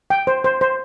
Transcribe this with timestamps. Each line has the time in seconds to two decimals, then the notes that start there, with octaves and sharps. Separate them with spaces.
0.10 G5
0.27 C5
0.44 C5
0.61 C5